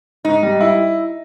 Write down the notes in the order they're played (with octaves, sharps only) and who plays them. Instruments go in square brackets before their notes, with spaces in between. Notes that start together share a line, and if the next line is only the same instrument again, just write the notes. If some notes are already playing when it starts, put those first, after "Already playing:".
[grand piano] G#2 [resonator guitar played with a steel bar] D#4
[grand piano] G3
E4